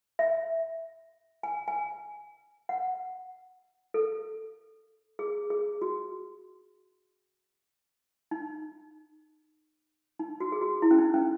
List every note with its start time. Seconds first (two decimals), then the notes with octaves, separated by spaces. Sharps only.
0.19 E5
1.43 G#5
1.68 G#5
2.69 F#5
3.94 A4
5.19 G#4
5.50 G#4
5.82 F#4
8.31 D#4
10.19 D#4
10.40 F#4
10.52 G#4
10.61 F#4
10.82 E4
10.91 C#4
10.98 D#4
11.14 C#4